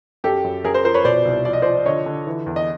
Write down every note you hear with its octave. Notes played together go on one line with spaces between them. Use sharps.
F#2 G4 A4
F#2
F#2 G#4 A#4
A#4 C5
F3 A#4 C5
B4 C#5
B2 C5 D5
C2
F3 D5
D#5
C5 D5
F3
D3 C#5 D#5
D3
E3
E2
D#5